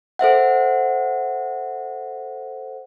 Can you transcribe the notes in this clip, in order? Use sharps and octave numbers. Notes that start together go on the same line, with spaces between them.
A4 C5 E5 F#5